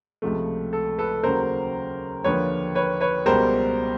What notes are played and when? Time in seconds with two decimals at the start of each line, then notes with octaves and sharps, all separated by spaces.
0.22 C#2 C3 F3 A3
0.73 A4
0.98 A4 B4
1.23 D#2 C#3 F#3 A#4 C5
2.24 D#2 D3 F3 A#3 B4 C#5
2.75 B4 C#5
3.01 B4 C#5
3.26 C#2 B2 G3 A#4 C5